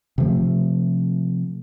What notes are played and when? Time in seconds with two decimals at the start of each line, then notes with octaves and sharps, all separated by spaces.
0.18 C3 F3 A3